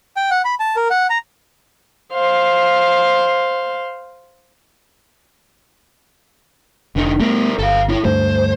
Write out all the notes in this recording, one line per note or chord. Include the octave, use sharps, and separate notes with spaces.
G5
F#5
B5
A5
A#4
F#5
A#5
C5 F5
F1 D3 D#4
G3 A3 B3 A#4
G1 A4 F5
E4 C#5
D2 G2 A3 C5